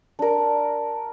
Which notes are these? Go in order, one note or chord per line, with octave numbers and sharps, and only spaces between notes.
D4 A#4